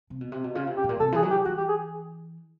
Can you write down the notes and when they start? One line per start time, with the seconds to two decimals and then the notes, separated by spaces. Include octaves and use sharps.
0.10 C3
0.21 B2
0.32 C3
0.44 B2
0.55 C#3 F4
0.67 C3
0.77 G4
0.84 A2
0.89 A#2
1.00 C3 A4
1.12 E3 G#4
1.22 F#3
1.31 G4
1.45 E3 F#4
1.58 G4
1.69 G#4